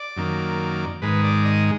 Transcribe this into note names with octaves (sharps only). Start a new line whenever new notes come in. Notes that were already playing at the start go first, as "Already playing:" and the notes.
Already playing: D5
F#2 D#3 A#3
G#2 D#3 G#3 B4
D5
D#5